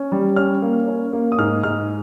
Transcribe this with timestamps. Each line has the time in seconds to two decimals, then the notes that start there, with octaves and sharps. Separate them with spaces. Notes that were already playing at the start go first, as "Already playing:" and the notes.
Already playing: C#4
0.12 G3
0.36 C#4 F6
0.62 A#3
0.88 C#4
1.13 A#3
1.32 D#6
1.39 G#2 F6
1.63 G#2 F6